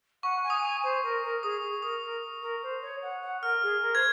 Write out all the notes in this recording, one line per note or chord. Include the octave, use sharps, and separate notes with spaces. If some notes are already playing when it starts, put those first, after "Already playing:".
F#5 C#6
G#5
D#6
G#5
D#6
C5
A#4
A#4
G#4 D#6
G#4
A#4 D#6
A#4
A#4
C5
C#5
F#5
F#5
A#4 F6
G#4
A#4
C5 G#6